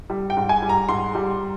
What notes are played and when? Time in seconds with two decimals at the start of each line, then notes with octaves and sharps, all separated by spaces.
0.10 G3
0.30 G5
0.37 G#2
0.49 G#5
0.62 G3
0.69 A#5
0.89 G#2 C6
1.15 G3